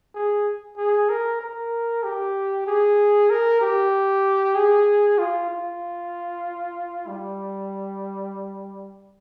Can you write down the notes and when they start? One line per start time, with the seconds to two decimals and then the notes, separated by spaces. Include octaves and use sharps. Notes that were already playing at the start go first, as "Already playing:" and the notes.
0.15 G#4
0.77 G#4
1.10 A#4
1.41 A#4
2.04 G4
2.67 G#4
3.30 A#4
3.61 G4
4.55 G#4
5.19 F4
5.50 F4
7.08 G3